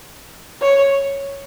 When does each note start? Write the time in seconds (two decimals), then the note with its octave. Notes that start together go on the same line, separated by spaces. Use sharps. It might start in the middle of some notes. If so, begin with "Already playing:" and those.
0.61 C#5